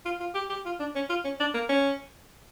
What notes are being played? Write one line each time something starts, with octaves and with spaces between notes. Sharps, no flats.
F4
F4
G4
G4
F4
D4
C#4
F4
C#4
D4
A#3
C#4